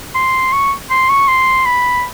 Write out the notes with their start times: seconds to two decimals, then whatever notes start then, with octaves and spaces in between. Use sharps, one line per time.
0.15 C6
0.53 C#6
0.90 C6
1.10 C#6
1.28 C6
1.66 B5